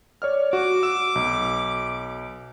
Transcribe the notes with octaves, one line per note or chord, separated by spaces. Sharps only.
C#5 D5 F6
F#4 D6
E6 E7
B1